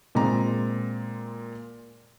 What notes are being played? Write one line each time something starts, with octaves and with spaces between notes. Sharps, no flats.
A#2 G#3 C4 A#5